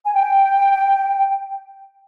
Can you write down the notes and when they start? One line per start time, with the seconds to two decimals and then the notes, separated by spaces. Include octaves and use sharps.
0.05 G#5
0.14 G5